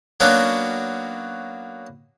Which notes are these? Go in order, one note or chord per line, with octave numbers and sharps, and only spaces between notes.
F#3 A#3 B3 C#4 D4 F#4